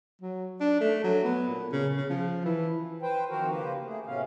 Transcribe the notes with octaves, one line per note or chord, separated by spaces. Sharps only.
F#3
D4
A3
F#3
B3
A#2
C#3
C#3
F3
E3
B4 C5 G5
D#3 F3 C4 F#4 A#4 C5
C#3 A#3 G4 B4 C5
A3 G#4
A2 C3 F#3 B3 C#4 F5